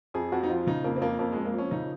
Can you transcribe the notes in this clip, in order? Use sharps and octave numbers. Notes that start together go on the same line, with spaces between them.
F2 G#4
F2 F#4
D#4
F3 F4
C#3 D#4
F2 A#3
C4
F2 A#3
F2 A#3
F2 G#3
A#3
F3 C#4
C#3 D#4